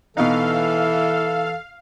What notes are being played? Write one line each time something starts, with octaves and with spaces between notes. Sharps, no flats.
B2 E3 D#4 A4 F5